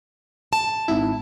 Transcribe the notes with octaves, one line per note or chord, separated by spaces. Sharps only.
A5
G#1 E4